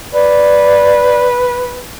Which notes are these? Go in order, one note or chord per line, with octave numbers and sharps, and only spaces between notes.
B4 D5